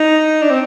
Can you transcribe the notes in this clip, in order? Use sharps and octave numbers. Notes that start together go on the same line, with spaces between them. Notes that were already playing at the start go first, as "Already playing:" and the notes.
Already playing: D#4
D4
C4